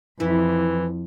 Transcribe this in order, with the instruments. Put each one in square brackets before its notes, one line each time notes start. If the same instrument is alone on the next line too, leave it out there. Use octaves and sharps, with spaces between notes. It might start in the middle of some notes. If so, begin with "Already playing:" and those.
[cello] F2 [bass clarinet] E3 [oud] E4